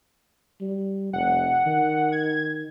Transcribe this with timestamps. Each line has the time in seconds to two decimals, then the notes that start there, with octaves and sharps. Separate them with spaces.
0.61 G3
1.13 F1 F#5
1.66 D#3
2.12 G#6